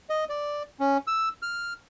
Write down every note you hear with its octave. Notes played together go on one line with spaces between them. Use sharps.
D#5
D5
C#4
E6
F6